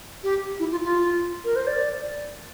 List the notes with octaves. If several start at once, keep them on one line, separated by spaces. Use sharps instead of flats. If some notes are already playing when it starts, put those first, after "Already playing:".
G4
E4
F4
F4
A#4
C5
D5